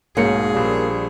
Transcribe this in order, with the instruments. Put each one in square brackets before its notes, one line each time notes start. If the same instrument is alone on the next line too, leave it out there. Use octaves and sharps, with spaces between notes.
[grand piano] B1 G#2 C#7 [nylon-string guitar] A#3 C#4 A#4 [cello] G#4
[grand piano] A#1 G3